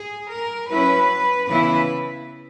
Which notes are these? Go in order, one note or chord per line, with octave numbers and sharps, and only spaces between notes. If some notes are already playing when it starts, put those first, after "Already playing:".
Already playing: G#4
A#4
F#3 C#4 E4 B4
C#3 E3 B3 E4 B4